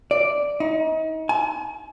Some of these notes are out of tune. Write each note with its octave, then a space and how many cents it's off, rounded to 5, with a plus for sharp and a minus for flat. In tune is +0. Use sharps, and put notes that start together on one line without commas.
D5 -5
D#4 +35
G#5 +40